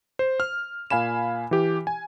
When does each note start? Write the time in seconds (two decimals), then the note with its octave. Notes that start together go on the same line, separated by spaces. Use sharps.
0.19 C5
0.40 F6
0.90 A#2 F5 G#5 B5 E7
1.51 E3 G4
1.87 G#5